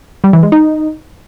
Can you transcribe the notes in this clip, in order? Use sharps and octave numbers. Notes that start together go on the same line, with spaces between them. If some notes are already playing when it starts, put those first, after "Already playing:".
G3
E3
G#3
D#4